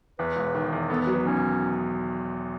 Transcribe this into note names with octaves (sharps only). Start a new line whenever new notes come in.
E2 B4
E1
D#3
E2
B3 A4
B4
F#3
B4
B1 C#4